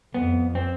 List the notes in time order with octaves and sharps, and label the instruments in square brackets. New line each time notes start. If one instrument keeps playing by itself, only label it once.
[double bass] F2 [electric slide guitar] B3
[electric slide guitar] C4